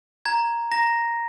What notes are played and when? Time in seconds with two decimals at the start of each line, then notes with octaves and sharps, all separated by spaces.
0.25 A#5 G#6
0.72 A#5 A#6